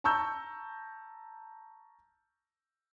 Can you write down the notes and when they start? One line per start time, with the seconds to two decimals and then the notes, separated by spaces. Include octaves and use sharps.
0.04 A5 A#5 C#6 E6 G6